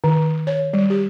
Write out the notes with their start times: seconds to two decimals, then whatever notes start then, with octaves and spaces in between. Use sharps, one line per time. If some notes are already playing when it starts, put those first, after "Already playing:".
0.04 D#3
0.47 C#5
0.73 G3
0.90 G4